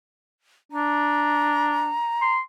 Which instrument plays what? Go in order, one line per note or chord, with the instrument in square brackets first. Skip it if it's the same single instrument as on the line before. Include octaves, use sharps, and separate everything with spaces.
[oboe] D4 [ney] A#5
[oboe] C6